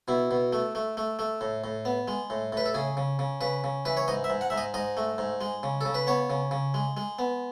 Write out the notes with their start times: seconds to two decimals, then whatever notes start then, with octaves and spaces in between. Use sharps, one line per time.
0.08 B2 E4
0.31 B2
0.53 A3
0.75 A3
0.97 A3
1.19 A3
1.41 A2
1.64 A2
1.85 B3
2.08 G#3
2.30 A2
2.52 A2 B4
2.65 A4
2.74 C#3 G#4
2.97 C#3
3.19 C#3
3.41 C#3 B4
3.64 C#3
3.85 E3 B4
3.97 C#5
4.08 G#2 D#5
4.24 E5
4.30 G#2
4.41 F#5
4.50 G#2 E5
4.58 D#5
4.74 G#2 D#5
4.97 A3
5.18 G#2
5.41 G#3
5.63 C#3
5.81 C#3 A4
5.94 B4
6.07 B3 C#5
6.30 C#3
6.51 C#3
6.74 G#3
6.97 G#3
7.19 B3